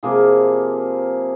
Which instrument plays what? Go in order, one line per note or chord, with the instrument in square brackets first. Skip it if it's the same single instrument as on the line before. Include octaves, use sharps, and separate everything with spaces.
[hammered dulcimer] C3 F3 A#3 G#4